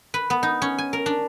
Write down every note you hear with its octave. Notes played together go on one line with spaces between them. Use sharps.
B4
B3
D#4
C#4
G#5
A#4
D4